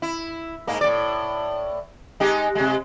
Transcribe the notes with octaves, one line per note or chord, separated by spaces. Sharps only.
E4
G#2 G#3 A#3
A2 D5
G#3 D#4 G4
C3 G#3